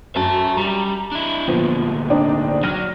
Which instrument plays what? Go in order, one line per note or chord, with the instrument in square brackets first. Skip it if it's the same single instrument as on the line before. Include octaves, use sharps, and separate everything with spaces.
[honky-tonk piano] F#2 [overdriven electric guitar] E5 A5
[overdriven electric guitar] G3 [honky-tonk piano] A#5
[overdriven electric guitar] D4 E4
[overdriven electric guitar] D2 A#2 [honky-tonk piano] F3 B3
[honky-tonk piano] C4 D4 D#4
[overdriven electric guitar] F#3 [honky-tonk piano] F6 A#6 D#7